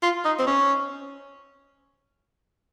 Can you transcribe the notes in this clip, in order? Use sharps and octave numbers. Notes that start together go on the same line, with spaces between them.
F4
D#4
C4
C#4